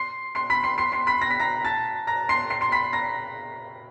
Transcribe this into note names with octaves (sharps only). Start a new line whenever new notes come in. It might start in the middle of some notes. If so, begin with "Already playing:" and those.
Already playing: C6 C7
C6 C7
B5 B6
C6 C7
C6 C7
C6 C7
B5 B6
A#6
B6
A#5 A#6
A5 A6
A#5 A#6
C6 C7
C6 C7
C6 C7
B5 B6
A#5 A#6